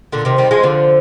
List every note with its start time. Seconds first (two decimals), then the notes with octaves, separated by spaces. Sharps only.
0.12 A#2 D3
0.25 C3 D#3
0.38 D#3 G3
0.51 F3 G#3
0.63 D3 F3